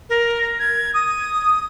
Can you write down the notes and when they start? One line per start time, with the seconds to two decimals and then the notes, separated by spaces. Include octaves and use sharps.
0.09 A#4
0.59 G#6
0.94 D#6